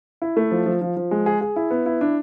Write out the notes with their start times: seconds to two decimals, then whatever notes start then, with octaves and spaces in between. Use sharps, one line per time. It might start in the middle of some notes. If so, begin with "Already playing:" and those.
0.22 E4
0.37 A3
0.51 F3
0.66 F3
0.81 F3
0.97 F3
1.11 G#3
1.26 G#4
1.41 G#4
1.56 E4
1.70 B3
1.86 E4
2.01 D4